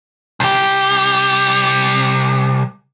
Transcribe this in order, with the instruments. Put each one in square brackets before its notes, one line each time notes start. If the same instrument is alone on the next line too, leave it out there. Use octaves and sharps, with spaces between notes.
[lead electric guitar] C2 G4